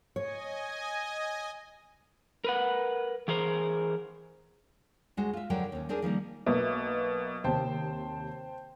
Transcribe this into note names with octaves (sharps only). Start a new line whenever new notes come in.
C#5 D#5 G#5
A#4 B4 F#5
E3 G#4 A#4 C5
D2 G#3 F#4
F4 E5
F2 D3 F#3 F#4 A#4 G5
D#2 C#4
C4 D4 G4 G#4 A#4 G#5
D#3 F3 G3 A#3
B1 B2 A#3 E5
D#2 C3 C5 G5 A5